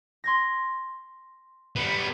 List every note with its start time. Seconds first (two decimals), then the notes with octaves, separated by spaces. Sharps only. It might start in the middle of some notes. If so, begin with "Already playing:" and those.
0.24 C6 G#6 A#6
1.76 G3 B3